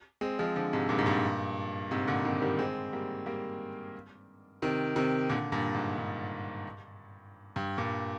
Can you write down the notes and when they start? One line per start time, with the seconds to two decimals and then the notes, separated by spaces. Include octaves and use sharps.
0.21 G#3 C4
0.39 F3 G#3
0.56 D3 F3
0.73 G#2 C3
0.89 G2 A#2
0.99 G#2
1.06 G2 A#2
1.91 G#2 C3
2.08 A#2 D3
2.25 C3 D#3
2.42 D#3 G3
2.59 G#3 C4
2.93 G3 A#3
3.26 G3 A#3
4.62 C3 D#3
4.96 C3 D#3
5.29 A#2 D3
5.52 G2 A#2
5.74 G#2
5.98 G2
7.56 G2
7.78 G2 A#2